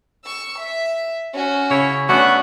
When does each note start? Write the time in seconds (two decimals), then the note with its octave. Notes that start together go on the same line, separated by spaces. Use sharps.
0.25 C#6 E6
0.58 E5
1.34 C#4 F#4
1.70 C#3 E4 C#5
2.09 A3 B3 C#4 D4 F#4